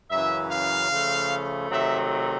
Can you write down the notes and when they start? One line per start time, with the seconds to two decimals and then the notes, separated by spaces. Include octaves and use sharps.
0.10 F#2 C#3 E3 E5
0.50 F5
0.90 C#3 F3 A3
1.70 C3 D#3 F#3 A3 E5